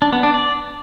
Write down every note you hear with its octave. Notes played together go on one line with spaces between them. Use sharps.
D4
B3
D4
D5